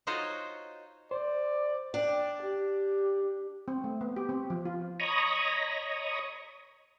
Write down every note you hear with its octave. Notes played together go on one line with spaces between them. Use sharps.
D#4 F4 F#4 C5 C#5 D#5
C5 D5
D4 G5
G4
C4
A3
B3
G4
C4
F3
F4
C#5 D#5 A#5 B5 C#6 D#6